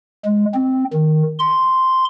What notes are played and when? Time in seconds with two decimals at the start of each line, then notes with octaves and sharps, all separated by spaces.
0.25 G#3
0.54 C4
0.93 D#3
1.39 C6